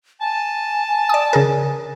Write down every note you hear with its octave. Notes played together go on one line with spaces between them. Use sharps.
G#5 A5
D5 D#6
C#3 G#4 A#4